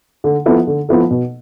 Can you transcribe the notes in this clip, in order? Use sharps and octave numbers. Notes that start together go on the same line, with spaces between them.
D3
F3 B3 E4 A4
D3
F3 B3 E4 A4
B2